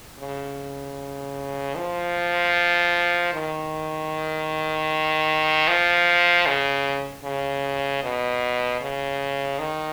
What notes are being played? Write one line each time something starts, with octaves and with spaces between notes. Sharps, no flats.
C#3
F3
D#3
F3
C#3
C#3
B2
C#3
D#3